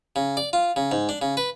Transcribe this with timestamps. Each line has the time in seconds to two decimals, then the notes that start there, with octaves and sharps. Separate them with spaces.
0.16 C#3
0.37 D5
0.53 F4
0.76 C#3
0.92 G#2
1.09 D4
1.22 C#3
1.37 B4